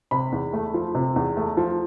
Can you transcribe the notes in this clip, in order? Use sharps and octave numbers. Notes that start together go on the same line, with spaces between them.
C3 B5
E2
A3
F3
C3
E2
A3
F3